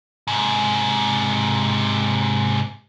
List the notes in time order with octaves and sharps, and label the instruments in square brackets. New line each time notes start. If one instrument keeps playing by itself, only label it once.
[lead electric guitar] G#2 C3